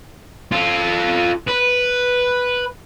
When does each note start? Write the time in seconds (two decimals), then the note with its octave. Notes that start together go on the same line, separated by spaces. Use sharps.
0.52 F4 A4
1.47 B4